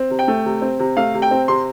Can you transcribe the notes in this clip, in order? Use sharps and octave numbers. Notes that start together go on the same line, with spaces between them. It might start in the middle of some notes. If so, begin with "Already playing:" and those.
Already playing: C4
C3
G5
A3
C3
C4
C3
A3 F5
C3
G5
C4
C3 C6